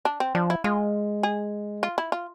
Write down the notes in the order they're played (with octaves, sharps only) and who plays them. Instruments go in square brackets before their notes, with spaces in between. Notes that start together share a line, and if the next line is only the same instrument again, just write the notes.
[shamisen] D4
C4
[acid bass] F3 [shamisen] D4
[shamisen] E4
[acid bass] G#3 [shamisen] F4
[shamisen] G#4
F4
E4
F4